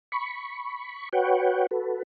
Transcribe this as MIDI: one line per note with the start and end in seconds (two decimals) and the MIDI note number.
0.12 1.09 83
0.12 1.09 85
1.13 1.66 66
1.13 1.66 71
1.13 1.66 73
1.13 1.66 78
1.13 1.66 79
1.71 2.03 66
1.71 2.03 69
1.71 2.03 71